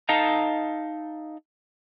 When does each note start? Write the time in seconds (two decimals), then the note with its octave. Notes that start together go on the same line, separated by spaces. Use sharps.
0.09 D#4 A4 D#5 F5 A5 A#5